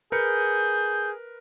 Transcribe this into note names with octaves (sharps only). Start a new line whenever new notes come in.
G#4 A#4 B4 G6 C#7